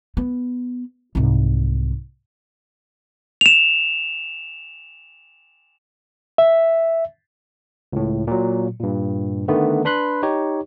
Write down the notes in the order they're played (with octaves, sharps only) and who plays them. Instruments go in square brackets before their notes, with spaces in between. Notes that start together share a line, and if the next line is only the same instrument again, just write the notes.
[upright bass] B3
C2 G#2
[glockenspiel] E7 F7
[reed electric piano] E5
[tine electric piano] C#2 A2
A#2 F#3
G2 A#2
D3 D#3 A3 B3
D4 B4 B5 C6 F#6
D#4 G4 C#5